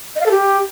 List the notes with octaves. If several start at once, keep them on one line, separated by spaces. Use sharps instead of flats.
D#5
F5
A4
G4